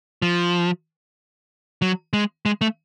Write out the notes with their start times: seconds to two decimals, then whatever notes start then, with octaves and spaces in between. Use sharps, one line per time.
0.22 F3
1.82 F#3
2.13 G#3
2.46 G#3
2.61 A3